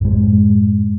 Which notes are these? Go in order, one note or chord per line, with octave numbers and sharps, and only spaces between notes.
F#2 A2 G#3